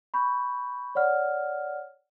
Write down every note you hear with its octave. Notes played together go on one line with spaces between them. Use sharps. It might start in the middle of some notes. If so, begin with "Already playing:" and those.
B5 C#6 G6
C#5 D5 F#5 F6